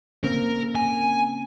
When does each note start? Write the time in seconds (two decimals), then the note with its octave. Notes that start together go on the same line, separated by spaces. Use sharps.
0.24 C#3 A#3 C4 A#4
0.75 G#5